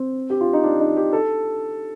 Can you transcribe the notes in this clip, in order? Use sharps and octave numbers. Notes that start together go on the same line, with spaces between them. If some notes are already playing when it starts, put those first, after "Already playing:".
Already playing: C4
G4
F4
D#4
D4
D#4
G4
A4